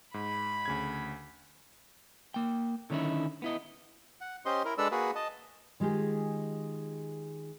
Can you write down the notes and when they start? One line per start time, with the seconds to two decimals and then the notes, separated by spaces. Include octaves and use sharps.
0.14 G#2 B5
0.65 D2 C#3 G#6
2.34 A#3 G5
2.90 D3 D#3 C#4 D#4 E4
3.42 B3 E4 D#5
4.21 F#5
4.46 C#4 G4 C5 D#5 C6
4.65 E4 A#4
4.78 G#3 D4 A4 B4 D5 E6
4.91 A#3 F#4 G#4 B4
5.15 D#5 A5
5.80 D#3 G#3 F4 G4 G#4